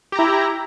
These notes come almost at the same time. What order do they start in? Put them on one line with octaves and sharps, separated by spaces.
G4 A#5 E4